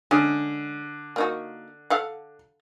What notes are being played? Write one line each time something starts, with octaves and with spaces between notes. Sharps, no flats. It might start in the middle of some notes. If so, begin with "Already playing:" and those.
D3 G#3 C#4
A#3 D#4 F#4
A4 F5 F#5